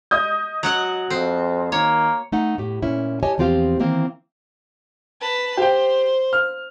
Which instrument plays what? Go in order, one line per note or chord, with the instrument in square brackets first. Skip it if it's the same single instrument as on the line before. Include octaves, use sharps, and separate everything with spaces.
[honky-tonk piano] D#5 D#6 G6
[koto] F#3 F#4 F#5
[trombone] F2 [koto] C4
[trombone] D#3 [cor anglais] A#3 [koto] C#5
[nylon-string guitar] A3 D#4 F#5
A2 G4
A#2 C#4 E4
G4 C#5 D#5 G#5 A5
E2 F3 C4 F4 G4 F5
D#3 E3 A#3 C4
[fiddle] B4 A5
[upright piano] G4 G5 [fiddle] C5
[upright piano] F6